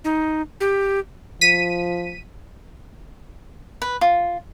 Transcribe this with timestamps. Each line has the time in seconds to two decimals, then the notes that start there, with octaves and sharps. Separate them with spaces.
0.04 D#4
0.61 G4
1.41 F3 B6 D#7
3.82 B4
4.01 F4